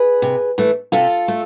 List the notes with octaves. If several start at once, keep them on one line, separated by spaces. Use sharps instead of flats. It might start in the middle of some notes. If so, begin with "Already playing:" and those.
Already playing: G#4 B4
C3
E3 A3
C3 F4 A4
A3